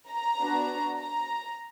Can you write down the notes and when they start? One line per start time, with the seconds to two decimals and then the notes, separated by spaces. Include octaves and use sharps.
0.09 A#5
0.39 B3 D4 F#4
0.98 A#5